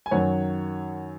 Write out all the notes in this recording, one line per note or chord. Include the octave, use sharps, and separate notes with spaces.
G#5
F#2 D#3 F#3 C#5 F#5